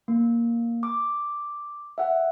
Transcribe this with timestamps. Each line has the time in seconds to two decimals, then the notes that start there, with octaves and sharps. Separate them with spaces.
0.08 A#3
0.83 D6
1.98 E5 F#5